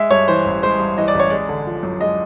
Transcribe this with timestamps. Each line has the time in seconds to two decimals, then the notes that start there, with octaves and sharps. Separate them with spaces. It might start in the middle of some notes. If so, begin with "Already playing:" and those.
Already playing: G#3 E5
0.11 G2 C#5
0.28 E3 C5
0.46 A1
0.63 G#3 C5
0.79 G2
0.98 E3 D#5
1.08 D5
1.15 A1 C#5
1.30 G#3 D5
1.49 D3
1.67 F3
1.83 F#2
2.01 G#3 D#5